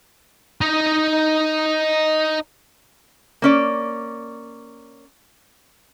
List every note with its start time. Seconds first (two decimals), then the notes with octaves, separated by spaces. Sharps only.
0.61 D#4 D#5
3.42 A#3 C#4 D5